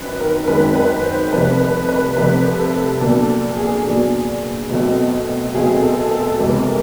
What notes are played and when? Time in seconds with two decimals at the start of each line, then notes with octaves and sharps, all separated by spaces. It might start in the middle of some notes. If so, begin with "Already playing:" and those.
Already playing: F#2 D#3 C4 B4
0.20 A#4
0.44 A#4
0.47 F#2 D#3 G#3 C4 B4
0.75 B4
1.04 C5
1.33 C2 C3 F3 A3 B4
1.60 B4
1.89 B4
2.17 C2 C3 F3 A3 B4
2.59 A4
3.01 A#2 F#3 B3 D4 A4
3.57 G#4
3.86 A#2 F#3 B3 D4
4.70 B2 F#3 A3 C4
5.54 B2 F#3 A3 C4 G#4
5.82 A4
6.11 A4
6.38 C#2 C3 E3 G#3 B3 A4
6.67 A#4